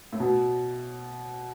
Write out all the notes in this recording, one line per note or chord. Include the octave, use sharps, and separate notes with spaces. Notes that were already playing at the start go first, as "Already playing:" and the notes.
A2
B2